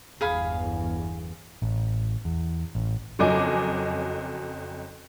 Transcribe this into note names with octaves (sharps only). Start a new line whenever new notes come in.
G1 E2 G#4 F5 B5
A1
E2
A1
F#1 F2 F#3 D#5 G#5 D6